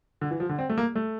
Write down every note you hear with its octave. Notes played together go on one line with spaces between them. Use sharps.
D3
E3
F3
D3
C4
A3
A#3
A3